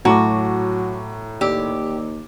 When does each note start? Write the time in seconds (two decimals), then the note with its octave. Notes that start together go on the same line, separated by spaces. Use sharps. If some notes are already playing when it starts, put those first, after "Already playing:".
0.05 A2 F#3 F#4 A5 A#5 C#6 D6
1.41 D#2 G4 D5 E6